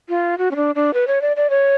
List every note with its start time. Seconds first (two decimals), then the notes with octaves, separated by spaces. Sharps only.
0.09 F4
0.38 F#4
0.51 C#4
0.56 D4
0.75 D4
0.94 B4
1.07 C#5
1.22 D5
1.37 D5
1.50 C#5